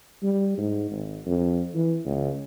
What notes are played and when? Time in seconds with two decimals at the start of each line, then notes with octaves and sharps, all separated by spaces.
0.23 G3
0.58 G#2
0.91 G#1
1.26 F2
1.74 E3
2.05 C#2